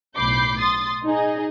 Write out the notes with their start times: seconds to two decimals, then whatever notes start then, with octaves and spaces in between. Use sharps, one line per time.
0.17 B1 A2 B5 D6 G6 C7
0.60 C6 D#6 A6
1.05 D#4 G#4 D#5